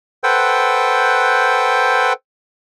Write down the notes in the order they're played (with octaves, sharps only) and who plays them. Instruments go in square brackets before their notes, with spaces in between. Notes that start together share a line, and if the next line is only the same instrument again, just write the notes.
[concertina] A4 B4 C5 F#5 G5